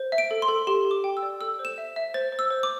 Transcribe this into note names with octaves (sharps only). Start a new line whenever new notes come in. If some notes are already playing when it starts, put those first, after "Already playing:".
Already playing: C5
E5
D7
A4
C6
A4
G4 C6
G4
D6
G5
E6
D5
A4 E6
C5
E7
E5
E5
C5 A6
C5
E6
C5
D6